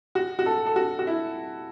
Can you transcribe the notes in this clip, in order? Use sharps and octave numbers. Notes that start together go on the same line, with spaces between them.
F#4
F#4
A4
A4
F#4
F#4
E4